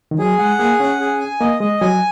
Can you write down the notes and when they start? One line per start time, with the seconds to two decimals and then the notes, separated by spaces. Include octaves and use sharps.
0.11 D#3
0.18 F#3 G#4
0.38 G#3 F#5
0.58 A#3 G#4
0.80 C#4 F#5
1.00 G#4
1.20 G#5
1.40 A#3 D#5
1.60 G#3 D#5
1.81 F#3 G#5